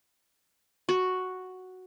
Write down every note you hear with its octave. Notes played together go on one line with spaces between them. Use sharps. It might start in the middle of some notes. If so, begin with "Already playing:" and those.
F#4